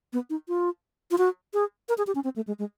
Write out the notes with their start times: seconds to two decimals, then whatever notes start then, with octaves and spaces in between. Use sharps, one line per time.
0.13 B3
0.30 D#4
0.48 F4
1.11 F4
1.18 F#4
1.54 G#4
1.89 A#4
1.98 G#4
2.07 G4
2.15 C#4
2.24 C4
2.36 A3
2.47 G#3
2.59 G#3